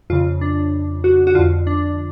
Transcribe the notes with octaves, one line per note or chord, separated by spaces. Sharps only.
F2 C#3 F4
D4
F#4
F#4
F2 D3 F4
D4